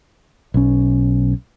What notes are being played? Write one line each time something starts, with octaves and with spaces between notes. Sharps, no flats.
B1 C#4